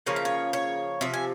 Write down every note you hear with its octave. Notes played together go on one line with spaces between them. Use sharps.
C#3 F3 A#3 C#5
E5
C#5
C#5
C3 F3 E5
G#5